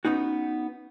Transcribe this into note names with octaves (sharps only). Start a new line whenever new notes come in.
B3 C#4 D#4 F#4